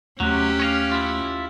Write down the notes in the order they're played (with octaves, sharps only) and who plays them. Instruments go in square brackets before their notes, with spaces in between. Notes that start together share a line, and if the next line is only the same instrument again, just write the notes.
[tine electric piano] D#2 A3 F#6 [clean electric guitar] C3 F#3 [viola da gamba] C#4 G4
[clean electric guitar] C#5 D#5 F5
E4 F4